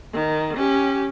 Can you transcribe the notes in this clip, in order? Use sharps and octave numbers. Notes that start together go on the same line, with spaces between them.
D#3
C#4 G4